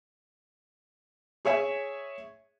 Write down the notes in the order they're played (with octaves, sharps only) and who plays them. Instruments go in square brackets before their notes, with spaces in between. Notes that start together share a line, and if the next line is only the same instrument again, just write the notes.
[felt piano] G#4 C#5 E5 G#5